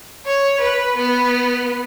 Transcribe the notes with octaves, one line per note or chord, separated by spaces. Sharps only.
C#5
B4
B3